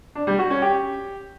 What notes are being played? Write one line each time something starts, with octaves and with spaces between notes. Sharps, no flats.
D4
G3
F#4
C#4
G4